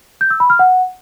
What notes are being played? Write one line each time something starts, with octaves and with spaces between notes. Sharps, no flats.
G6
E6
B5
F6
F#5